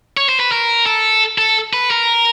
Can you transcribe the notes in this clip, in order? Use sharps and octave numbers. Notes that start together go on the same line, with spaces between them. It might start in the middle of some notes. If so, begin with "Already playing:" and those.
C#5
C5
B4
A#4
A4
A4
B4
A#4